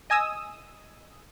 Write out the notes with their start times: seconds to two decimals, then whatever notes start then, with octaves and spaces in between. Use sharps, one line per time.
0.10 D#5 G#5 D#6 E6